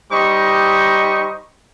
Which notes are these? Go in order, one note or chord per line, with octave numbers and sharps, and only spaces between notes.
G3 D#4 G4 C5 D#5 C#6